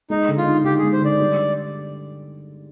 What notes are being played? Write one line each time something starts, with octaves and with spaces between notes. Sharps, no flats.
G#3 D#4
D3
F4
D#4
D3 G4
G#4
G#3
C5
D3 D5
G3